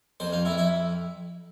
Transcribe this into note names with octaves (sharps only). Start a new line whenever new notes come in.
F2 C5
F4
F2 E4
E4